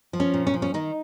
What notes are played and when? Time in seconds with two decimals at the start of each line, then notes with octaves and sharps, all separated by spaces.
0.13 F3
0.20 C#4
0.34 A#2
0.47 C#4
0.54 F3
0.62 C#4
0.74 D#3 D#4